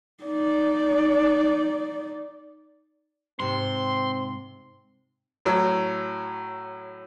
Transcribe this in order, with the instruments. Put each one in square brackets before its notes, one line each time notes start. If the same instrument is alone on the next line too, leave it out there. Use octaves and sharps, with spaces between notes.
[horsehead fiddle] D#4 D5
[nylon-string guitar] G#2 C3 [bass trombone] C4 [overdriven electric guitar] C6
[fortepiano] A2 F#3 E6